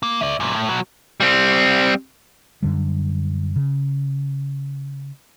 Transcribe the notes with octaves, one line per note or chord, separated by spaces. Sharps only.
A#3
D5 E5
F#2 A#2
A2
B2 F#3
G3 C4
F#2 D3 G3
C#3